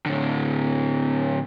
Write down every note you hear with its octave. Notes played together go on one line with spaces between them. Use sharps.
A2 D3